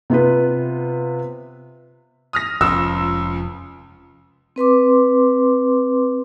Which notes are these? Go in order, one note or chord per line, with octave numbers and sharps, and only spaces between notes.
C3 B3 F4 B4
D#6 F6 A#6
F1 C#2 F3 E6
C4 B4 C6 D6